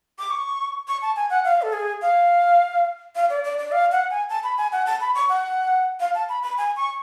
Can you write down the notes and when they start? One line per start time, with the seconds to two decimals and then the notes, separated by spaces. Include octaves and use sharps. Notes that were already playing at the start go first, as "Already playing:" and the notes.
0.19 D6
0.30 C#6
0.88 C#6
1.02 A5
1.16 G#5
1.30 F#5
1.45 F5
1.62 A4
1.73 G#4
2.01 F5
3.15 F5
3.30 D5
3.44 D5
3.58 D5
3.72 F5
3.92 F#5
4.10 G#5
4.29 A5
4.43 B5
4.57 G#5
4.72 F#5
4.86 A5
5.01 B5
5.15 C#6
5.29 F#5
6.00 F5
6.15 A5
6.29 B5
6.43 B5
6.58 G#5
6.76 C#6